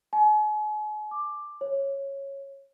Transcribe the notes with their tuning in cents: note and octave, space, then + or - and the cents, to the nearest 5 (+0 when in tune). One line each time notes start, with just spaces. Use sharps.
G#5 +40
D6 +10
C#5 -10